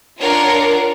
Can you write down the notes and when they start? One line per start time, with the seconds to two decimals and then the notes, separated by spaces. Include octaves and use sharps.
0.20 D4 F4 A#4 C#5 F#5 A#5